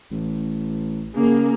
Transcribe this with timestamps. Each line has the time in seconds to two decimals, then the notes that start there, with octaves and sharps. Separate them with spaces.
0.11 A1
1.16 C#3 A#3 G#4